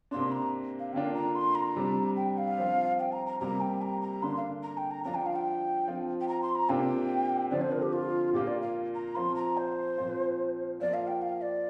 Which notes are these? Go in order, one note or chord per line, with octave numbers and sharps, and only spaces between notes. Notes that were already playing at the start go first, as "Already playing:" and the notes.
C3 A#3 D4 C6
A#5
F5
D3 A#3 D4 F4 G5
A#5
C6
A#5
C3 G3 D4
G5
F5
F3 C4 F4
G5
A#5
A#5
C3 G3 A#3 A#5
G5
A#5
A#5
D3 A#3 D4 C6
F5
A#5
G5
A#5
F3 D4 F4 A#5
G5
F5
G5
F3 C4 F4
G5
A#5
C6
A#5
C3 A#3 D4 F4 G5
D3 F3 C4 D5
C5
A#4
G4
F4
A#2 A#3 F4 G4
D5
F5
A#5
F3 C4 F4 C6
A#5
C5
A#2 F3 C4 F4
F3 A#3 F4 D5
F5
G5
F5
D5